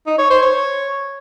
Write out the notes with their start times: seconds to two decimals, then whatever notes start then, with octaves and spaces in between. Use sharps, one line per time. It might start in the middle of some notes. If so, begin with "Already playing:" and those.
0.07 D#4
0.18 C#5
0.30 C5
0.42 C#5